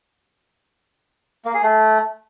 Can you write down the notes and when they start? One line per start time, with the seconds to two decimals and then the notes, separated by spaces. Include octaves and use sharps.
1.45 A#3
1.54 G#4
1.63 A3